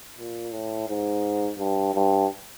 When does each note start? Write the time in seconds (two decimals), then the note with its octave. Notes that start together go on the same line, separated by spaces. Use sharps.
0.18 A#2
0.53 A2
0.89 G#2
1.59 G2
1.94 G2